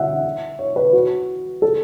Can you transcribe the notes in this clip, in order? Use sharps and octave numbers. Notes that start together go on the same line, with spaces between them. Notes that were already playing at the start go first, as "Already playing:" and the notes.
Already playing: E5 F#5
C#5
B4
F#4
A4